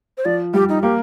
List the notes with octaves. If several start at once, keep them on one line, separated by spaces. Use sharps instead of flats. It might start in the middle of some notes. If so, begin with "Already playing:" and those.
C5
F3 D5
G3 G4
D#4
A#3 G4